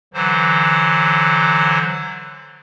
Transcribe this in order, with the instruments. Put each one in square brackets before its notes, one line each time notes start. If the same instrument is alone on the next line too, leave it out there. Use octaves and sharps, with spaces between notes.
[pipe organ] D3 E3 F#3 C5